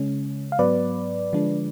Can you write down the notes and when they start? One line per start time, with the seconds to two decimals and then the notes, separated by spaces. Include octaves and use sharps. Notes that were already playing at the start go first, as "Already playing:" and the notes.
Already playing: C#3 G#3 C#4
0.52 F5
0.59 G#2 F#3 B3 B4 D5
1.33 D3 F3 G#3 D4